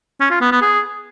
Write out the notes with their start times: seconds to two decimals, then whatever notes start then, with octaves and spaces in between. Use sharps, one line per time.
0.20 C#4
0.31 F4
0.41 B3
0.51 B3
0.62 G#4